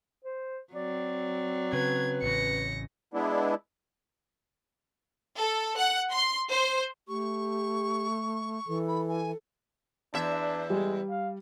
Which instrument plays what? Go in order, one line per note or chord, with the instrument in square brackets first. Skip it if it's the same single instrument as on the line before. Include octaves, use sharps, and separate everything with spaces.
[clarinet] C5
[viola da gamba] F#3 C4 [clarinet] D5
[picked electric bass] C#3 [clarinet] B4 [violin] G#6
[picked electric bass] A1 C#3 [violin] A#6 C#7
[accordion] G#3 B3 D4 E4
[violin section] A4
F#5
C6
C5
[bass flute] A3 [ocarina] G4 [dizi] C#6
[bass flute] E3 [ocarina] A4
[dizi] B5
G#5
[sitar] E2 E5 [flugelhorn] D4
[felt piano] G3 [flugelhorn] G#3
[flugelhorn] F5